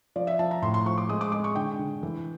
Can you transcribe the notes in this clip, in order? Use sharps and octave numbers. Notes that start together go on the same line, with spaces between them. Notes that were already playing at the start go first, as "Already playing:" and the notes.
F3 D5
E5
F3 A5
A#5
A2 C6
C6
F3 C#6
D6
G#3 D#6
D6
G#3 D6
C#6
D3 G5
D3
E3